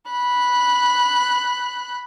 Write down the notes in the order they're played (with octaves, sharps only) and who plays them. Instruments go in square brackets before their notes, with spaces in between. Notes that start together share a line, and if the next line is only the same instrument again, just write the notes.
[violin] B5 F#6